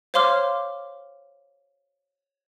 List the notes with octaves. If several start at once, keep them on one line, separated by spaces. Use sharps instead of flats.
C5 C#5 F5 C6 D6 F6